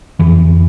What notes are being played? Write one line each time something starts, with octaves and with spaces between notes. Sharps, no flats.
F2 E3